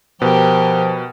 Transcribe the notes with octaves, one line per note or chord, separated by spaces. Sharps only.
B2 F3 G4 A#4 B4